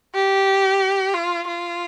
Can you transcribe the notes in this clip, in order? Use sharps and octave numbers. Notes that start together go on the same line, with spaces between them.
G4
F4
F4